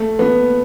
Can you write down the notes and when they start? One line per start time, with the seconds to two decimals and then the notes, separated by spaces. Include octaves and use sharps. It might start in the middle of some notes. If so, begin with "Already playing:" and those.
Already playing: A3
0.19 B3